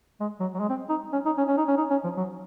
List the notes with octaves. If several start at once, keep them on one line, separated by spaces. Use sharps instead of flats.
G#3
F#3
F#3
G#3
C4
D#4
C#4
D#4
C#4
C#4
D#4
C#4
D#4
C#4
F3
F#3